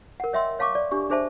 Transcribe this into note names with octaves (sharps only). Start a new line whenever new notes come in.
A#4 F#5
C#5 D#5 E5 G5 C6 E6
C#5 F5 A5 C#6 D6
D5
D4 G4 C#6
D4 G#4 C5 E5 A5